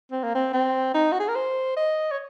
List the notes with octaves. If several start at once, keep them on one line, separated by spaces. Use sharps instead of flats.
C4
A#3
C4
C4
D#4
F#4
G#4
A#4
C5
D#5
C#5